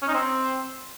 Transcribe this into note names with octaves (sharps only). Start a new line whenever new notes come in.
C#4
D#4
C4